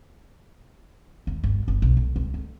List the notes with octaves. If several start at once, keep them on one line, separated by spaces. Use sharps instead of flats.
D#2
G1
G1
B1
D2
C#2
D2